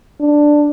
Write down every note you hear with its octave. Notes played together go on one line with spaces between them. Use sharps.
D4